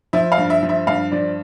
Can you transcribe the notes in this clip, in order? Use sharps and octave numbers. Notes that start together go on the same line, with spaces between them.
F3 E5
F5
G2
E5
F3
E5
G2 F5
F3 D5